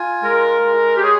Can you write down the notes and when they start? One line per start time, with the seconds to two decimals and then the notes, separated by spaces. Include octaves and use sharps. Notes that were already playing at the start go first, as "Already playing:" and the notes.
Already playing: F4 G#5
0.22 G#3 A#4
0.62 G#3
0.97 G4
1.02 G#4 C#5